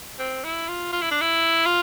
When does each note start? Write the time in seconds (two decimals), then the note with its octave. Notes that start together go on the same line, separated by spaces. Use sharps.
0.19 C4
0.44 E4
0.69 F4
0.93 F4
1.02 E4
1.11 D4
1.21 E4
1.66 F4